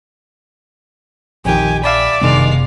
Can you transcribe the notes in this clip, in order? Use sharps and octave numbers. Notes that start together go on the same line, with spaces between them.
A#1 F2 D#3 G4 G#5
D5 E5 F5 A5 B5
F#1 G2 C3 D#3 G#3 B3 F5